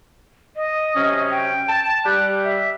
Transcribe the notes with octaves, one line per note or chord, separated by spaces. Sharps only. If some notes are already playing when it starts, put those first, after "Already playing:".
D#5
C3 F#3 C#4
G5
A5
G3 G4 F#6
E5